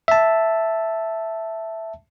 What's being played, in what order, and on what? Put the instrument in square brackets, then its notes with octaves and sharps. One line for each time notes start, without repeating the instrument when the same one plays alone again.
[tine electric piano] E5 A5